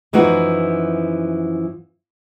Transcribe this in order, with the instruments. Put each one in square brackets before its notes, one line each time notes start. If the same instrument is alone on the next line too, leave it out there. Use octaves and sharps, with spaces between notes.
[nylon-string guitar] F#2 E3 F3 D#4 F#4